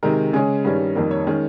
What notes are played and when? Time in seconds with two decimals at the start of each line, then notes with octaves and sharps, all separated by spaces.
0.03 C3 D#3 G#3 A#4
0.33 C#3 G#3 C#4 G#4
0.64 G2 D#3 G3 C#4
0.96 F2 D#3 G3 A#3
1.11 C#5
1.27 D#3 G#3 C#4